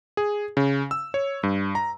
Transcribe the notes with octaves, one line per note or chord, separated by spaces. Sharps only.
G#4
C#3
E6
C#5
G2
A#5